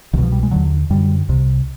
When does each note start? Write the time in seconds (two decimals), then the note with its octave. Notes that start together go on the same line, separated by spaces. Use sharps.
0.13 C2 B2 D#3
0.23 F3
0.32 G3
0.43 G#3
0.51 D#2 D3 F#3
0.90 F#2 D3 G3
1.29 C2 C3